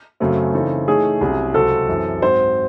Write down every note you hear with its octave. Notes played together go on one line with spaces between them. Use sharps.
F#2 C#3 F#3 A3 C4
C#3 E3 C4 D#4 A4
E3 A3 D#4 G#4 A4 C#5
C2 C3 F#3 C#4
C#2 C3 F#3 C4 F#4 A4
F#2 E3 C4
G#2 F#3 C4 C5